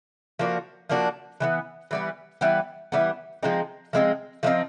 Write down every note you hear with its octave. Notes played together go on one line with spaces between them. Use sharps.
F3 A#3 D4 F#4
F3 A#3 D4 F#4
E3 G3 B3
E3 G3 B3
E3 G3 B3
E3 G3 B3
F3 G#3 C4 D#4
F3 G#3 C4 D#4
F3 G#3 C4 D#4